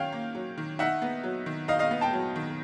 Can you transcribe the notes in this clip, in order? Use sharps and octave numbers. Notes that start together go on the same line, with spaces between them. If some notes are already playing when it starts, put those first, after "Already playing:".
Already playing: D#3 F#3 C#4 F5 G5
A#3
F#3
D#3
D#4 E5 F#5
B3
F#3
D#3
D#4 D#5 F5
D#5 F5
B3
G5 A5
F#3
D#3